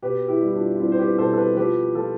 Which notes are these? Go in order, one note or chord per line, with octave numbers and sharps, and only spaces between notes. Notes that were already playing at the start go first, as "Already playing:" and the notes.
B2 G4 B4
E4 G4
G3
E4
D4 F4
F4
G3 C4 E4
C5
G4 B4
B2 A4 C5
A4
G4 B4
F3 G4 B4
F3 F4 A4